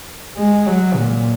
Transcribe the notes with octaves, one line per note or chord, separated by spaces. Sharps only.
G#3
F#3
A#2